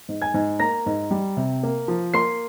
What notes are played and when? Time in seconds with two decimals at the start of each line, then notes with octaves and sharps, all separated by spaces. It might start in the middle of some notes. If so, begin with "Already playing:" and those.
0.09 G#2
0.22 G#5 G#6
0.34 G#2
0.59 A#3 A#5 A#6
0.86 G#2
1.11 G3
1.37 C3
1.63 A#3
1.88 F3
2.14 A#3 C6 C7